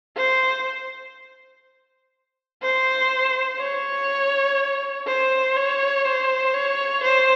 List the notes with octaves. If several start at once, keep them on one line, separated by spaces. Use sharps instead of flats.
C5
C5
C#5
C5
C#5
C5
C#5
C5